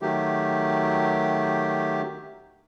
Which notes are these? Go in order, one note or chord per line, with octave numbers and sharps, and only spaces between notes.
D#3 F#3 A3 G4